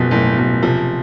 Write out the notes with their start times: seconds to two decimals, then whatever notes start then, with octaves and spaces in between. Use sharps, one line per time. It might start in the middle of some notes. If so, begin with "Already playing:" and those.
Already playing: F#1 B2 F3
0.11 F#1 A2
0.37 F#1 B2
0.63 C3 F3